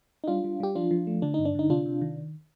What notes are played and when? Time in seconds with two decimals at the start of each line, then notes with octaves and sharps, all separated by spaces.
0.24 D#4
0.28 G3 D4 F4
0.44 G3
0.60 G3 G4
0.75 F3 D4 F4
0.91 F3
1.07 A3
1.22 D3 D4
1.34 G2 D#4
1.45 D4
1.55 D3 D#4
1.70 C3 D4 F4
1.86 C3
2.01 D#3